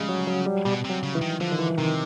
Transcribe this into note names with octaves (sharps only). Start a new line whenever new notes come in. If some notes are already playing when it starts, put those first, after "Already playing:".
Already playing: C#3 F3 G3 G#3
F#3
F#3
G3
B2 G3
C3
F#3
C#3
E3
D#3
D3 F3
D#3
E3
C3 D#3